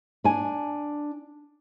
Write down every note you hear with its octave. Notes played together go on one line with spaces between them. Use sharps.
D4 G#5